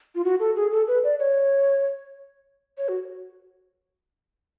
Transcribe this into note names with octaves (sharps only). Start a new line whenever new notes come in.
F4
F#4
A4
G#4
A4
B4
D5
C#5
C#5
F#4